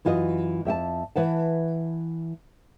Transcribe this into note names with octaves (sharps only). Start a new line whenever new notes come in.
F#2 E3 F4 F#4 D#5
F2 E5 G5 A5
E3 B4 F#5 A5